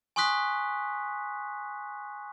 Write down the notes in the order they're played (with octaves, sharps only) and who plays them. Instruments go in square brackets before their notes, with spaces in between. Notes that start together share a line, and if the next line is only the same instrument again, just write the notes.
[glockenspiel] G#5 C6 C#6 D#6 F#6 B6